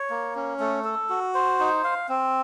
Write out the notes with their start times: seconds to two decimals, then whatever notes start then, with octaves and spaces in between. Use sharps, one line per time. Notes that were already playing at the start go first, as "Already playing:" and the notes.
Already playing: C#5
0.10 A#3
0.35 C#4
0.60 A3
0.84 A4
1.10 F#4
1.34 C5
1.59 D#4
1.84 F5
2.09 C4